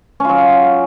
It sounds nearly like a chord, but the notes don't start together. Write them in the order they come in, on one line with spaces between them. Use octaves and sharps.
C#4 F4 F#3